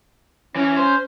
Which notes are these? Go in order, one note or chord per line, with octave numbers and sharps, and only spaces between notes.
E3 C#4
C5